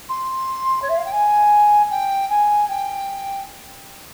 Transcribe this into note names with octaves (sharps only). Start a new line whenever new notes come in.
C6
C#5
E5
F5
G5
G#5
G5
G#5
G5